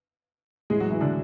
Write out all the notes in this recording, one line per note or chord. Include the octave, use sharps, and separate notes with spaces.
A2 E3 G#3 G#4
F#3 F#4
E3 E4
D3 D4